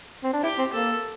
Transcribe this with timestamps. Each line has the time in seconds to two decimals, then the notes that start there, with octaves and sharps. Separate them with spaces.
0.24 C4
0.33 D4
0.43 E4 G4
0.59 C4
0.73 A#3 A4